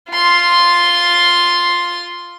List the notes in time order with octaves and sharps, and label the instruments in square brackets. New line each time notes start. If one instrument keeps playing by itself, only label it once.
[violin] F4 C6